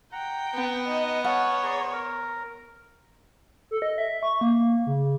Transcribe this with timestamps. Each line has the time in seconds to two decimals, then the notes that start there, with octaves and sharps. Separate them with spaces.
0.12 F#5 G5 A#5
0.54 B3
0.88 D#4 D#5
1.24 C#5 F#5 A5 F6
1.63 G#4 D5 A#5
1.93 A#4
3.71 A4
3.82 D#5
3.98 E5
4.23 C#6
4.41 A#3
4.87 C#3